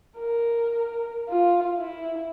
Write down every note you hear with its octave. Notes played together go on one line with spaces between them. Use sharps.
A#4
F4
E4